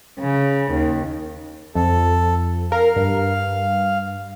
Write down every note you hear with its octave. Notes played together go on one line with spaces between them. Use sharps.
C#3
D#2
F2 A4
A#4 F5
G2